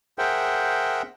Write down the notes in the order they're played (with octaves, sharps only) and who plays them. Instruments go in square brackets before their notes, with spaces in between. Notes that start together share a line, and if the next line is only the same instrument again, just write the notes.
[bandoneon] G#4 A#4 C5 E5 F#5 G5